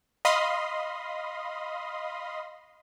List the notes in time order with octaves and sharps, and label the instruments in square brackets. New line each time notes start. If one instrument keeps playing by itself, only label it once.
[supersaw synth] D#5 F5 B5 C6 D#6